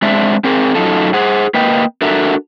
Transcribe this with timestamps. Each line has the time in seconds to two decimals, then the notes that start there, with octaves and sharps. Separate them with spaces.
0.02 G#3 C4 D4 E5
0.44 C4 G#4 A#4
0.75 F#2 F#3 C#4 D#4 F4 A4
1.14 G#4 C5 F#5
1.54 A#3 B4 D#5 G5
2.02 D4 F#4 A4 A#4 E5 A#5